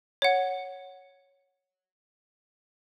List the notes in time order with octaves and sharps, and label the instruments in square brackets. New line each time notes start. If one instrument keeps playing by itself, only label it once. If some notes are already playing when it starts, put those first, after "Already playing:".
[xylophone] C#5 F#5